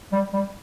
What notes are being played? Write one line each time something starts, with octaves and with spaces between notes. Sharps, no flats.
G3
G3